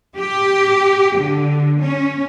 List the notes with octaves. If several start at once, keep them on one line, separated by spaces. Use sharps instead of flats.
G4
D3
C#4